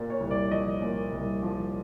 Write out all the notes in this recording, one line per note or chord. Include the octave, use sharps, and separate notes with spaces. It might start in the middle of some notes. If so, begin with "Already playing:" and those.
Already playing: A#2
C#5
C2
D5
F3 D#5
A#2
C2
F3